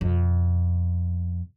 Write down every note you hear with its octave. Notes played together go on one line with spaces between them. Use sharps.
F2 B2